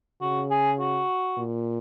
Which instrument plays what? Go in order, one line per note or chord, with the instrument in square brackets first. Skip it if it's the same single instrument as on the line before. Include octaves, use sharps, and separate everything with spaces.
[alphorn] C#3 [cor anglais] F#4
[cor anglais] G#4
F#4
[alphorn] A#2